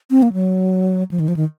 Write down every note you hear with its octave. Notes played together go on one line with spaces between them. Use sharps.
C4
A#3
F#3
F3
D#3
F3
D#3